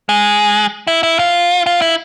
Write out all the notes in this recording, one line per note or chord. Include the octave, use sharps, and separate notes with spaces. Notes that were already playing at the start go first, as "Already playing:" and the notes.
G#3
E4
E4
F4
F4
E4